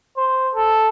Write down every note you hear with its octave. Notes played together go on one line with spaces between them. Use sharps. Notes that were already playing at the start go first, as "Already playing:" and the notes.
C5
A4